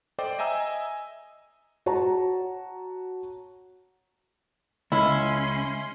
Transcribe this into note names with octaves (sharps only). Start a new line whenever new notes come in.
A4 C5 D5 D#5 G5 D6
D#5 E5 G#5 A#5 E6
F#4 C#5 A5 A#5
C#2 C#4 E4 C6